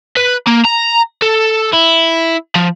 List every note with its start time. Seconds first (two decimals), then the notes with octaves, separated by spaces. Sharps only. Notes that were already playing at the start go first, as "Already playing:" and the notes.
0.17 B4
0.47 A#3
0.65 A#5
1.22 A4
1.73 E4
2.55 F3